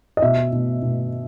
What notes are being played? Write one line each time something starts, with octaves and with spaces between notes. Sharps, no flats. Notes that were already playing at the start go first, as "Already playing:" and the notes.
D#5
B2 E5
B2
B2